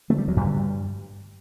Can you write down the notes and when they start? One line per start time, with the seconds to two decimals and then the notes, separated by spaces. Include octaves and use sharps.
0.10 D3 A3
0.18 G3
0.27 D2 F#3
0.36 G2 G3
0.46 D3